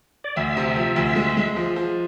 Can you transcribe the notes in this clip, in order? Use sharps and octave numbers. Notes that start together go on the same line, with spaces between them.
D5
D2 E5
C3
F3
D2
G#3
G#3
F3
F3